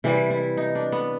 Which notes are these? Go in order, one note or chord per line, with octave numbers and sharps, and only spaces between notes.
C3 E3 G3 E4
E4
D#4
D4
B3